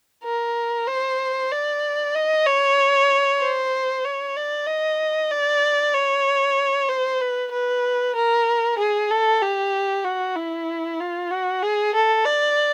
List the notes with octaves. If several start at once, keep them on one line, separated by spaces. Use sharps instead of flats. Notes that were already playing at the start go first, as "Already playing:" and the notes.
A#4
C5
D5
D#5
C#5
C5
C#5
D5
D#5
D5
C#5
C5
B4
B4
A#4
G#4
A4
G4
F#4
E4
F4
F#4
G#4
A4
D5